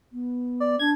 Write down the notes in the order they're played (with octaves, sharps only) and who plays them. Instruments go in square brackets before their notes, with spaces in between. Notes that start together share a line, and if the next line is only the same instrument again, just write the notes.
[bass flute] B3
[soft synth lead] D5
[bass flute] D4 [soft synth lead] G#6